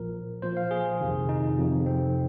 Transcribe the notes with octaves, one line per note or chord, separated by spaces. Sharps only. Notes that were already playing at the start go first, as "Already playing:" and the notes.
Already playing: A#1 A#2 F3 A#4
A#1 A#2 F3 C5
F5
G#4
F2 C3 D#3
D#4
F2 C3 F3
C4